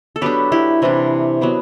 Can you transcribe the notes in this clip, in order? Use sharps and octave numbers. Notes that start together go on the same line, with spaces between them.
A4
F#3 B3 D4 G4 B4
E4 G4
C3 E3 G3 D4
F#3 B3 D4